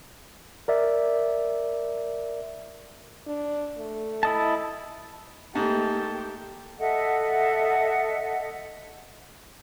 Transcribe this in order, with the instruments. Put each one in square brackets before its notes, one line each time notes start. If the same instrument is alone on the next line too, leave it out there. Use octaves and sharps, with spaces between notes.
[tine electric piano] A#4 D5 E5
[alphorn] D4
A3
[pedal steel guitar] E4 D#5 A5
[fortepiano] G#2 [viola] A3 A#3 [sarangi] G4 [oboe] A5
[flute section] A4 D#5 E5 F#5